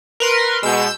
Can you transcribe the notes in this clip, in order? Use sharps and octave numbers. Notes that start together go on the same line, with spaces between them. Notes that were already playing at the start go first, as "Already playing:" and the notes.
A#4 B4 C6
B2 G#3 E6 G6